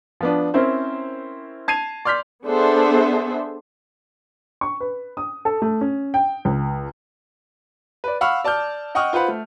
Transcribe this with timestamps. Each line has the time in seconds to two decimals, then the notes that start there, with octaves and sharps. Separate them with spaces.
0.21 F3 B3 D4
0.54 C4 C#4 E4 A#4 C5
1.68 A5 G#6 C7 D#7 F7
2.05 D5 C6 F6 G6 B6
2.45 B3 D4 G#4 A4 C5 E5
4.61 C#6
4.80 B4
5.17 D#6
5.45 A4
5.62 A3
5.81 C#4
6.14 G5
6.45 C#2
8.04 B4 D5
8.21 F5 F#5 B5 C#6 E6 F6
8.44 D5 A5 D6 F6 G6
8.95 D#5 F#5 G5 C#6 D#6 F6
9.13 F4 B4 C5 F#5 B5
9.28 A3